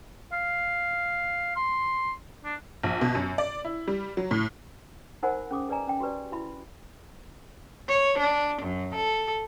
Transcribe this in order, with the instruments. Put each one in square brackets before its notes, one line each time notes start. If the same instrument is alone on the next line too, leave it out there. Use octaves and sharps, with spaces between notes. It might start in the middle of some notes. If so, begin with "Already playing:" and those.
[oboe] F5
C6
D4
[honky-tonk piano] A#1
B2
F#2
D5
E4
G3
F#3
A2
[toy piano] D#4 A#4 C5 F#5 G#5 B5
C#4 G#4 D6 D#6
G#4 B4 D5 D#5 G#5 A#5
C#4 G5
F#4 G4 B4 D5
E4 F#4 E5 B5
[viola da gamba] C#5
D4
F#2
A4